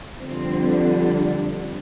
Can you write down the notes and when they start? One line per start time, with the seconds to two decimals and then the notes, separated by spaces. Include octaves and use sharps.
0.16 F2 D3 G3 C4